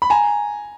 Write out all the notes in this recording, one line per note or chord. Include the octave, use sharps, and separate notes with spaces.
B5
G#5 A#5